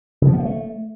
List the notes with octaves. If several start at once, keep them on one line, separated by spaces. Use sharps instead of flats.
C#3
F3
B3
A#3
A3